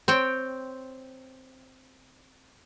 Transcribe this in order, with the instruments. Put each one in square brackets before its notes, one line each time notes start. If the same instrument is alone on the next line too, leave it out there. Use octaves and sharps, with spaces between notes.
[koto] C4 C#5 G5